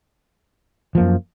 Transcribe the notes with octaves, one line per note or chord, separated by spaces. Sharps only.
F#2 F3 A#3